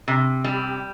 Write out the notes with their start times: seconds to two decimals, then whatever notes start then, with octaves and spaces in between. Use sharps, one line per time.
0.08 C3
0.44 G3